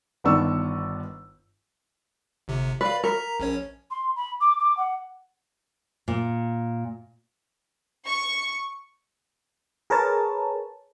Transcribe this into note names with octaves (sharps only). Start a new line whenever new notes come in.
G1 D#3 B3 D4 C#6 E6
G1 C3
B4 D5 F5
A#4 A#5 B6
A#1 C#4 C#5
C6
B5
D6
D6
F#5
A#2
C#6
G#4 A#4 B4 C#5 A5